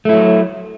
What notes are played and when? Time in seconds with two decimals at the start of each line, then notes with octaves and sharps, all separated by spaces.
0.05 A3
0.09 E4
0.13 F#3